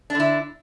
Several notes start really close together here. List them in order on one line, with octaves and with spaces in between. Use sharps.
D4 D3 E4